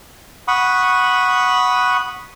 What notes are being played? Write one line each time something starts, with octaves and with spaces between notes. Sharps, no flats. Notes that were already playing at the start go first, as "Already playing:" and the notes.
F#5 B5 C#6 D#6